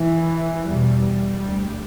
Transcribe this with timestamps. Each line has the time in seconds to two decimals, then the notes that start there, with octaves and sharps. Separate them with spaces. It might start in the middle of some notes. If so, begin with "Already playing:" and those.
Already playing: E3
0.67 E2 B2 G3
1.42 D2 G3